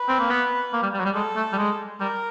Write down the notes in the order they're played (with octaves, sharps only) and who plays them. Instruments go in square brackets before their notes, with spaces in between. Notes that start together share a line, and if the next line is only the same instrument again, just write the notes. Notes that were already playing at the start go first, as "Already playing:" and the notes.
Already playing: [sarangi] B4
[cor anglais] C4
A#3
B3
A#3
G3
G3
F#3
G3
[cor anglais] G#3 [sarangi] A4
[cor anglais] A3
G3
G#3
[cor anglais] G3 [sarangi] A#4